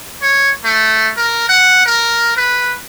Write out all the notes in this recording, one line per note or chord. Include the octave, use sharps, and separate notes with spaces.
C#5
A3
A#4
F#5
A#4
B4